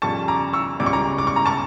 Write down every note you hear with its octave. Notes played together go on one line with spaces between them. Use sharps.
F2 C#3 G3 A5 C#6
A#5 D6
C#6 E6
C#2 C#3 G3 D6
C#6
A#5 D6
D6
C#6
A#5
A5 C#6